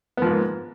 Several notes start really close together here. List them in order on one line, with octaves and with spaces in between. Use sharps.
B3 F3 G#2 A#3